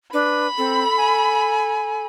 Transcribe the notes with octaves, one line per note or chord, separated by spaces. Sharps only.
D4 B4 B5
C4 A4
G#5